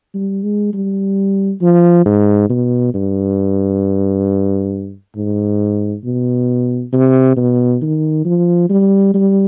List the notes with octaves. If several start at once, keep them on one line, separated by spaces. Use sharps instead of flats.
G3
G#3
G3
F3
G#2
B2
G2
G#2
B2
C3
B2
D#3
F3
G3
G3